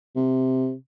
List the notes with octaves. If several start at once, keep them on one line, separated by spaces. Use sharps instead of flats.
C3